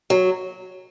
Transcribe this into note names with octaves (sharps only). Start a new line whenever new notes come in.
F#3